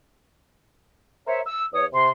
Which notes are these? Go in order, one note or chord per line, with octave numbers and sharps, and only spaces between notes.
A#4 C5 C#5 E5
E6
E2 C#5 D#6
C3 C6